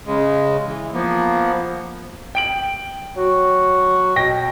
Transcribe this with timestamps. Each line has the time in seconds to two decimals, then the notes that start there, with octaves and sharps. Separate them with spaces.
0.06 C#3 G#3
0.66 E3
0.93 F3 A#3 B3
2.35 G5 D7 F#7
3.16 F#3 F#4
4.16 B2 G5 A#6